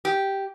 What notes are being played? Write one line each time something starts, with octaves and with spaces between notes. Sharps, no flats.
G4